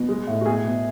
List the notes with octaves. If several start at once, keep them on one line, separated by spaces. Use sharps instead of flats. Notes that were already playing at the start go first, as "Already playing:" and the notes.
Already playing: B2
G#3
A2
F#4
B2 G#4
B2